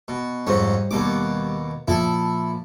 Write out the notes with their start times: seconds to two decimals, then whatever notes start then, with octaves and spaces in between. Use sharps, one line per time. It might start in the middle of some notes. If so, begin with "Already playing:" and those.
0.08 B2
0.47 F2 G#2 G3 C#4 C5
0.91 D#2 B2 G3 D6
1.88 A#2 F3 E4 A4